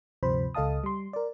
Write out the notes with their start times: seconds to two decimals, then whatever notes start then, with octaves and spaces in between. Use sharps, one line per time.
0.23 D2 G2 C3 F3 C5 B5
0.54 C#2 A4 D#5 F5 A5 D#6
0.84 G3 C6
1.13 A#4 D5